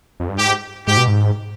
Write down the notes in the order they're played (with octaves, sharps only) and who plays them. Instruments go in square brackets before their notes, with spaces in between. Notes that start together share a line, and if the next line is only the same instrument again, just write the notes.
[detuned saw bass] F2
G2
[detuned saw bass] G#2 [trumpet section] G4
[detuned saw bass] G#2 [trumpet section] G4
[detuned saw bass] B2
G#2